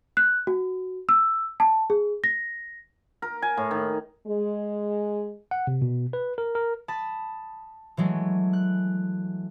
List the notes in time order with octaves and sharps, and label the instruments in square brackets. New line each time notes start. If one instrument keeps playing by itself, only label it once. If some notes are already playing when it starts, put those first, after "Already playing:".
[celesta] F#6
F#4
E6
A5
G#4
A#6
[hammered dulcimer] A#4
G#5
A2
D#3
[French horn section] G#3
[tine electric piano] F#5
C3
B2
B4
A#4
A#4
[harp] A5 B5 D#6 A6
E3 F#3 G#3 A3
F#6